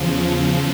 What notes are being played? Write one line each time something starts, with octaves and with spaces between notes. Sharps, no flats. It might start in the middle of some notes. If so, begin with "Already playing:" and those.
Already playing: E2 C#3 F3